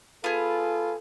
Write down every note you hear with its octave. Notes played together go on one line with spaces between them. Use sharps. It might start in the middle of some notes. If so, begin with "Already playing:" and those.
B3 F4 G#4 A4